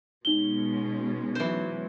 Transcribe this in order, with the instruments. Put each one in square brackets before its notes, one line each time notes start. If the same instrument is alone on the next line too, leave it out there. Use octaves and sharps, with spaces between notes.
[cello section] B2 G#3 C#4 [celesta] D#4 G7
[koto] E3 C5 [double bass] F#3